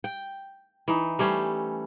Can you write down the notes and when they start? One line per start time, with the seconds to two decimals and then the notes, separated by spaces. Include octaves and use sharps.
0.04 G5
0.88 E3 D#4
1.19 G3 A3 C#4 C5